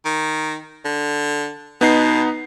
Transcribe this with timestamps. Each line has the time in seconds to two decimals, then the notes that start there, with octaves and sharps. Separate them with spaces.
0.05 D#3
0.85 D3
1.81 B2 B3 D#4 C7